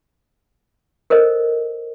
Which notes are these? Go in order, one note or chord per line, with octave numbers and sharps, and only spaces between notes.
A4 A#4 C5 D#5